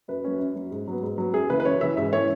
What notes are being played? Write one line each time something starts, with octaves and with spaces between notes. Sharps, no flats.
F#2 B4
F#3 C#4
F#2
F#3 C#4
G#2
F#3 B3
G#2
F#3 B3
F#2 G#4
C#3 E3 B4
B4
F#2 C#5
C#3 E3 E5
G#2 E5
E3 C#4 C#5